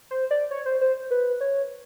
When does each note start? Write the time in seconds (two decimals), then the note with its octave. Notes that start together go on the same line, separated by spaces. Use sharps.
0.11 C5
0.31 D5
0.51 C#5
0.66 C5
0.81 C5
1.11 B4
1.41 C#5